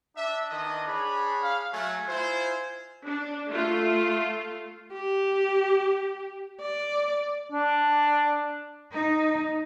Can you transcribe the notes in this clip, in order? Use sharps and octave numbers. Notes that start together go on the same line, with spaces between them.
D4 E5
D#3 E3 D#5
G#4 C#5 B5
F5
F#3 A3 G#5
E4 F4 C5
D4
A3 F4
G4
D5
D4
D#4